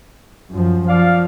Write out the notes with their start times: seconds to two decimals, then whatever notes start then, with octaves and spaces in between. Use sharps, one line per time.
0.51 F#2 F3
0.88 F3 D5 F5